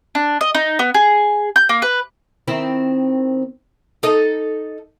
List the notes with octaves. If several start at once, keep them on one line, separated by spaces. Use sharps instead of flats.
D4
D#5
D#4
B3
G#4
G6
A#3
B4
D#3 C4 E4
D#4 A4 D#5